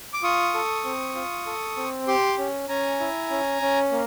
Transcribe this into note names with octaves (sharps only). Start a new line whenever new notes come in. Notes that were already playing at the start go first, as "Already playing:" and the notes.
D6
F4 C#6 D#6
A4
C4
F4
A4
C4
G4 C6 D6
C#4
C#4 G#5 A#5
E4
C#4
C#4
A#3